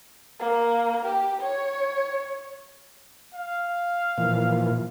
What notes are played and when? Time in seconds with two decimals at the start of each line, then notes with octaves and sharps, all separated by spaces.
0.40 A#3
1.05 G4
1.41 C#5
3.34 F5
4.18 A#2 E3 F3